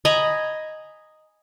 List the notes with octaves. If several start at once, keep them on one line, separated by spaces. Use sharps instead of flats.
D#5 G#5 A#5 B5